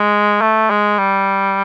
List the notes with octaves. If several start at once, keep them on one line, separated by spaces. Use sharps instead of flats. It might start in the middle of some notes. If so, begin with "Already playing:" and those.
Already playing: G#3
A3
G#3
G3